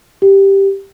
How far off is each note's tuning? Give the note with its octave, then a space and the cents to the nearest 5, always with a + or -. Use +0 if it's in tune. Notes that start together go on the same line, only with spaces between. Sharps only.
G4 +0